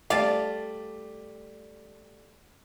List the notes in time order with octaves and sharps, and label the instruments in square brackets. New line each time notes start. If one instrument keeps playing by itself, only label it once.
[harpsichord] G3 A3 [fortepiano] D5 [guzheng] F5 A5